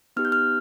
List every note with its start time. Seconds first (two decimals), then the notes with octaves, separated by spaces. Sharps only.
0.17 B3 D#4 G4 F6
0.25 G6
0.32 F6